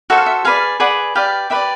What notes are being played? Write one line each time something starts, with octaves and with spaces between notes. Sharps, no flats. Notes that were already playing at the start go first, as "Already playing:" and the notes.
F#4 A4 C5 E5
F5
E5
G#4 B4 D5 F5
G#4 B4 D5 F#5
G4 B4 D5 F5
G4 B4 D5 E5